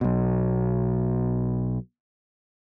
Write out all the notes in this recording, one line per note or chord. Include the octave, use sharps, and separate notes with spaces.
B1 B2